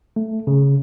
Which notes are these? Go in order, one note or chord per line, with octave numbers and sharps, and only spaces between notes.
A3
C#3